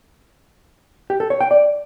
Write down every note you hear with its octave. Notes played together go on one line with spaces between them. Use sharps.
G4
A4
C#5
G5
D5